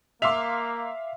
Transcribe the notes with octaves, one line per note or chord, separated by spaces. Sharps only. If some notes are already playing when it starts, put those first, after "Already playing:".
A#3 E5 F5 C6 D6 E6 F7